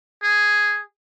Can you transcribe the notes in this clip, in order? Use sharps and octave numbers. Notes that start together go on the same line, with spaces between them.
G#4